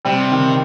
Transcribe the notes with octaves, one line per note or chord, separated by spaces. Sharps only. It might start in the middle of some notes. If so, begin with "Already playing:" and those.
C3 G3
D#3